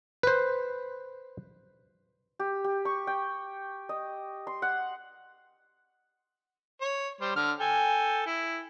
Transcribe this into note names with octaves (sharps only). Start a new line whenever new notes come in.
B4 C5
G4
G4
C#6
G5
D#5
C6
F#5
C#5
G3 C5
D3 F6
A4 G5 G#5
E4